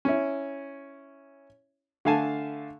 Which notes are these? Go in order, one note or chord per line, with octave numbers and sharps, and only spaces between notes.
C#4 E4
D3 A3 F5 G#5 A5